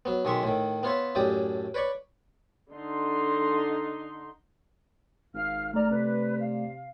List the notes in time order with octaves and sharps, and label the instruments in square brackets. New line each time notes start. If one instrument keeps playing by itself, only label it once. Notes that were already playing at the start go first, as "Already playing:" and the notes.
[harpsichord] F#3 B3
B1 D#3 G#3 E5 C#6
A2 D#3
B3 F4 C#5 E5
F#2 A2 G4 D5 D#6
B4 C#5 D5 B5 C#6
[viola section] D3 D#4 C6
[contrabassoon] G#1 [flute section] F5 F6
[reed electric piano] A3 D5 [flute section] A#5 F6
[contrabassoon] C3 [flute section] B4
[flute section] F5